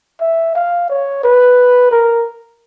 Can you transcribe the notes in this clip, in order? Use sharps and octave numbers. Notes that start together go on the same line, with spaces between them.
E5
F5
C#5
B4
A#4